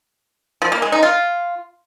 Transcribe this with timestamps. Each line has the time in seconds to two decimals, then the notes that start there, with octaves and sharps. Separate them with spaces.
0.62 F3
0.72 A#3
0.82 G#3
0.92 D#4
1.03 F4